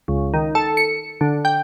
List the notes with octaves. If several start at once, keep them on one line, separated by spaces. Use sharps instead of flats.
C#2
D#3
A4
C#7
D3
G5